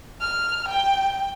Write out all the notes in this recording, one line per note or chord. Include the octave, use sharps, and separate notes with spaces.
F6
G5